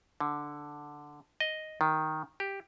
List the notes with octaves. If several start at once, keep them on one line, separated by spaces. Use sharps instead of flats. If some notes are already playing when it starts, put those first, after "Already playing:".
D3
D#5
D#3
G4